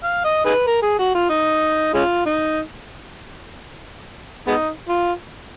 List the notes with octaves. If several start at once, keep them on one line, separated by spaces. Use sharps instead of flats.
F5
D#5
D#4 G#4 B4
A#4
G#4
F#4
F4
D#4
G#3 C#4 F4
D#4
G#3 B3 D#4
F4